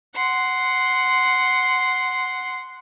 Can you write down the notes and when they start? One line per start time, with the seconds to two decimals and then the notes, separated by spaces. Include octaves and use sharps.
0.15 F#5 C6